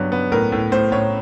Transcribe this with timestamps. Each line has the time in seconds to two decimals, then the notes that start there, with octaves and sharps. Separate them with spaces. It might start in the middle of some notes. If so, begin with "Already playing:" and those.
Already playing: G2 F#3 B3
0.12 B3
0.32 A2 A#4
0.52 A2
0.72 A2 C5
0.92 A2 C#5